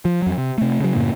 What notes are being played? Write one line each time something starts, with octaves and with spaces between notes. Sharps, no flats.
F3
F2 F#3
C3
C3 A3
C#3 F#3
F#2 A2 C#3 A#3